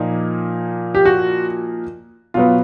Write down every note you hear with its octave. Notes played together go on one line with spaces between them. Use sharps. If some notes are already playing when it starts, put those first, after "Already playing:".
Already playing: A#2 F3 A#3 D#4
G4
F#4
B2 F#3 B3 F4